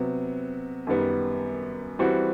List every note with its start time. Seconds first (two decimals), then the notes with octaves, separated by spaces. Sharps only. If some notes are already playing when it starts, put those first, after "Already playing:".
Already playing: C3 F#3 B3
0.87 F#2 D#3 G3 B3
1.99 E3 G3 C4 F#4